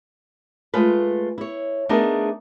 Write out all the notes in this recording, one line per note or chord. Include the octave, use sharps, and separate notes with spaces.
G#3 A3 F4 B4
E4 C#5
A3 B3 D4 D#4 G#4 A#4